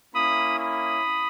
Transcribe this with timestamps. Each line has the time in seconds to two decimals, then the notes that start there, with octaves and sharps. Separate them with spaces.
0.15 A#3 C#4 E4 B5 D#6
0.59 B5 D#6